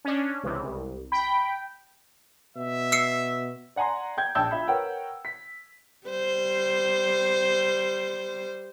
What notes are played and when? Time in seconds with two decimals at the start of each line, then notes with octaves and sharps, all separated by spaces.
0.05 C#4 D4
0.43 C#2 C3 E3
0.63 C2
1.12 G5 B5
2.57 B2 E5
2.92 E6 C7 C#7
3.76 D5 F#5 G#5 A#5 C6
4.17 G5 G6 G#6
4.35 A#1 D4 G5 A5 E6 G6
4.51 F4 E5 B5
4.68 A#4 B4 C#5 F#5 G5
5.25 B6
6.07 G3 C5